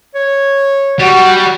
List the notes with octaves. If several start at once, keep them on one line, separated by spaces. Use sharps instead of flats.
C#5
G3 F#4